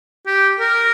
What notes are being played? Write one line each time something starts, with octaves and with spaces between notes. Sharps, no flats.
G4
A#4